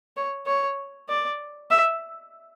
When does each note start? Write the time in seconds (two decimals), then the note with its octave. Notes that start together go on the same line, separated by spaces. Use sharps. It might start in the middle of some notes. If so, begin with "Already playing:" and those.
0.17 C#5
0.46 C#5
1.09 D5
1.71 E5